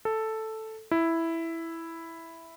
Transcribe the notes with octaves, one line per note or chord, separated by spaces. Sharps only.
A4
E4